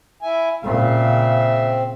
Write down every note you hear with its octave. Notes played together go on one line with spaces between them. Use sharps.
E4 G#5
A#2 C#3 C4 E5